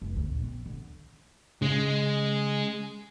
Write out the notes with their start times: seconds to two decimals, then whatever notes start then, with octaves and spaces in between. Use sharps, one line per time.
0.02 F1
0.16 D2
0.29 A#1
0.44 C4
0.66 D3
1.62 C#3 G#3